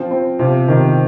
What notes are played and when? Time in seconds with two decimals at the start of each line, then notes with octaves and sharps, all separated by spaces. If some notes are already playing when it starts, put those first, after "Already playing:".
Already playing: F3 C4
0.11 C4
0.39 C3 F3
0.68 C3 D#3